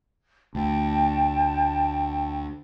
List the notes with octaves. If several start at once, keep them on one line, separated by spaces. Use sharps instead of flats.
D2 G5 A5